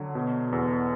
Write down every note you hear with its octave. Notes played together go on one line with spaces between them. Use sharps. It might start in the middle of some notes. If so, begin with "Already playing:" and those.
Already playing: D3 F#3
B2
E2